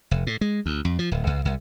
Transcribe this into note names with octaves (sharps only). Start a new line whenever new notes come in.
F1
A2
G#3
D2
F2
F3
D1
C#2
C2